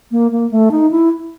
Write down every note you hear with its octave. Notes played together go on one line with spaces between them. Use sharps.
A#3
A#3
A3
D#4
E4